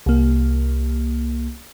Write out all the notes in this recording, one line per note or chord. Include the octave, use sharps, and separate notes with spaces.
C2 A#3